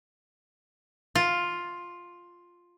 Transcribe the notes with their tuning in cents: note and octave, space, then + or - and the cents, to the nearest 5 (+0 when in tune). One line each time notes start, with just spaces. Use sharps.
F4 +5